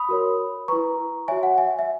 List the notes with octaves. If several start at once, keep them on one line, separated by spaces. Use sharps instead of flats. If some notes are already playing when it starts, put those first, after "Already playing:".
Already playing: B5 D#6
F#4 A#4 C#5
E4 B4 A#5 C#6
F#4 C#5 E5 G#5
F#5
E5 G#5
E5